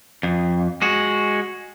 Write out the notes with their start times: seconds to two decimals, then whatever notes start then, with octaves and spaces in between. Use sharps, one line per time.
0.23 F2
0.82 G#3 F#4